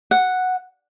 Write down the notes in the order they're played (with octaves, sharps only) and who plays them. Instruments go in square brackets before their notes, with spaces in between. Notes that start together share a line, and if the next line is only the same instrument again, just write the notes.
[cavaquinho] F#5